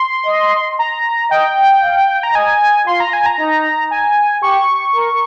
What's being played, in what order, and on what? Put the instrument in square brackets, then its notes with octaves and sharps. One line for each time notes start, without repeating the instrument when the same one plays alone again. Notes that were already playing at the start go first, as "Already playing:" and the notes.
Already playing: [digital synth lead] C6
[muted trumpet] D#5
[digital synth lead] A#5
[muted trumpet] D#5 [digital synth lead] G5
[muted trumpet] F5
[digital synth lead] A#5
[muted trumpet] D#5 [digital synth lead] G#5
[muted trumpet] F4 [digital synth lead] C6
[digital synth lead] A#5
G#5
A#5
[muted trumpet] D#4
[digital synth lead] G#5
[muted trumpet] G4 [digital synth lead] C#6
[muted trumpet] A#4